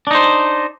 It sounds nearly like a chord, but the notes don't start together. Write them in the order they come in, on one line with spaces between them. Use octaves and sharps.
D4 D#4 C5